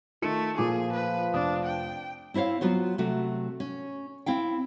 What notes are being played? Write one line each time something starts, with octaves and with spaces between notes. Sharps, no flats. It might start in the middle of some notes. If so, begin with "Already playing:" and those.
D#3 A3 F4 C#7
A#2 F3 G#4 D6
B4
F1 D4 D#6
G5
C4 E4 C5 C#5 F5
F#3 B3 F4 F#4 C5
C3 F#3 A3 F#4
C#4
C4 E4 F5 G5